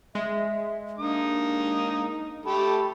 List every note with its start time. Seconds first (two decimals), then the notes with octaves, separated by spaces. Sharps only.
0.15 G#3 E5
0.98 A#3 D4 D#4 D#6
2.46 A3 G4 A4 B5